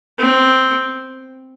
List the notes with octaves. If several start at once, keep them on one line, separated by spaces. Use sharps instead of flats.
C4